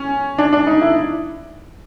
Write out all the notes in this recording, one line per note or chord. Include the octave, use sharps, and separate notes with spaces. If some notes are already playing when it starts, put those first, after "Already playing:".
Already playing: C#4
D4
D4
D#4
E4